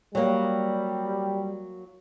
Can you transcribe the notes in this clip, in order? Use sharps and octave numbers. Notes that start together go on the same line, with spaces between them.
F#3 G3 A#3